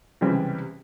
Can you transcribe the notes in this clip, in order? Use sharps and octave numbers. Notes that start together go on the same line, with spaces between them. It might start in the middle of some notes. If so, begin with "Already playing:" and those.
C#2 C3 E3 G3 C4